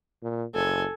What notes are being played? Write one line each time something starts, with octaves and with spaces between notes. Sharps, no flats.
A#2
F#1 A4 G#5